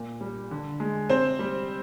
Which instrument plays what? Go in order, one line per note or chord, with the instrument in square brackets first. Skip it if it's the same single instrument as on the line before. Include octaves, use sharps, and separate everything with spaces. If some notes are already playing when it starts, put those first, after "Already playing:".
Already playing: [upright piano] A#2
G3
D3
G#3
C3 C4 C5
G3